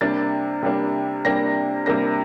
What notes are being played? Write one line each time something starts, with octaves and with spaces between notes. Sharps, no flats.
C3 G3 A#3 D4 A6
C3 G3 A#3 D4
C3 G3 A#3 D4 A#6
C3 G3 A#3 D4 A#6